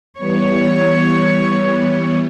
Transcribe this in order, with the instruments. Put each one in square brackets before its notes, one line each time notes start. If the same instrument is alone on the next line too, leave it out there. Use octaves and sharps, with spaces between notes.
[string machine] E3 G3 B3 [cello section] C#5